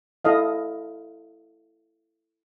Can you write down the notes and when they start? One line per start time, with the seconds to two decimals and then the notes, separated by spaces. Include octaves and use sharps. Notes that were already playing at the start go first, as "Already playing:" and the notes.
0.25 E4 A4 D#5 F5